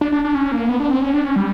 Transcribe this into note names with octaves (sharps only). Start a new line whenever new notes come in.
D4
D4
D4
C#4
A#3
B3
D4
C4
C#4
D4
C#4
G3